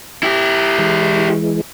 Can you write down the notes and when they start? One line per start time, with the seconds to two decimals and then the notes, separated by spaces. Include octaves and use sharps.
0.23 E4 G4
0.78 E3 G#3